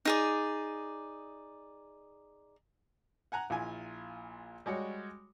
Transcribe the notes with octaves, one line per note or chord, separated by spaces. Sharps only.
D#4 G#4 D5
F#5 G#5 A#5 F#6
A#1 E4 F4 G#5
G3 G#3 F#4 C#5